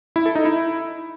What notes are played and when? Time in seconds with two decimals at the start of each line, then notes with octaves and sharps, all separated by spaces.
0.16 E4
0.26 A4
0.35 D#4
0.45 E4